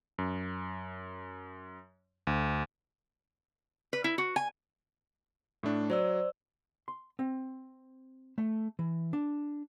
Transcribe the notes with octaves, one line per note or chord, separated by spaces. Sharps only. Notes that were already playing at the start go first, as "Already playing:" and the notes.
F#2
D2
B4
E4
F#4
G#5
A2 A3 D4
F#3 C5 D5 E6
C6
C4
A3
E3
D4